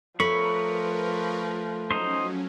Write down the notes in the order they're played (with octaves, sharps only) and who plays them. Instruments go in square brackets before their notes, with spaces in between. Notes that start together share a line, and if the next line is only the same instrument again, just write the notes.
[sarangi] F3 [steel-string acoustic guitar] A3 [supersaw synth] A#4 B4 [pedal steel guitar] C#5 B5
[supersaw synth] F#3 C#4 [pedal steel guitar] D#4 C5